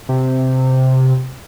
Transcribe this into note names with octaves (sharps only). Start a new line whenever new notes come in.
C3